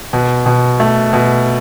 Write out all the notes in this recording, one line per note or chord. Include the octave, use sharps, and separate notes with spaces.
B2
B2
A3
B2